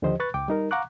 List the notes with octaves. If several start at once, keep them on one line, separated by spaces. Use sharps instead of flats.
D#2 D3 F3 G4 C5 D#5
B4 B5 C#6 F#6 A6
C#2 G5 D6
G3 D#4 A#4
F5 F#5 A#5 C#6 D6 F#6